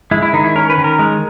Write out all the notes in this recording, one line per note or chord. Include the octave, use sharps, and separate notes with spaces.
G#3 E4
E4
D#3 D#4
E4
C#4 A#4
B4
D#3
A#4
G#3